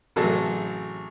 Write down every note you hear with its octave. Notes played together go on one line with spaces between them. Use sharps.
A1 C3 F#3 G#4 A4 A5